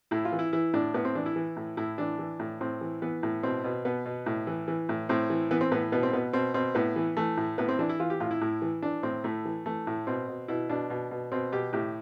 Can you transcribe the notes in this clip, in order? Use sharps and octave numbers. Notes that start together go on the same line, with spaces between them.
A2 E4
F4
E3
E4
E3 E4
A2 D4
A2 B3
C4
E3 D4
E4
E3
A2
A2 E4
E3 D4
E3
A2
A2 C4
E3
E3 B3
A2
B2 C4
B2
B2 B3
B2
A2
E3
E3
A2
A2 C4
E3
E3 B3
C4
A2 B3
B2 B3
C4
B2 B3
B2 C4
B2 C4
A2 B3
E3
E3 A3
A2
A2 B3
C4
E3 D4
E4
E3 F4
G4
A2 F4
E4
A2
E3
E3 D4
A2 C4
A2 A3
E3
E3 A3
A2
B2 C4
B2
B2 E4
B2 D4
B2
B2
B2 C4
B2 G4
A2 G4